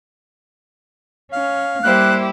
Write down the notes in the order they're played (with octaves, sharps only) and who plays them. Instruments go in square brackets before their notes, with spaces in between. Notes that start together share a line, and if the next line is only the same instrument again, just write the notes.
[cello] C#4 [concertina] F5
[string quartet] G3 E4 G4 [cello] A#3 C5 [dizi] F#6